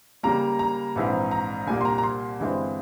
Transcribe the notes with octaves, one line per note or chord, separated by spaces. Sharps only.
C#2 C#3 G3 A#3 A#5
A#5
A#1 G#2 E3 G#3 C4
A#5
C2 A#2 G3 A#3 G#5
C6
A#5
A#5
C6
G1 G2 E3 G#3 C4